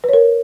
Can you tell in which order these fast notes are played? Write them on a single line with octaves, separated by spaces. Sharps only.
B4 C#5 A#4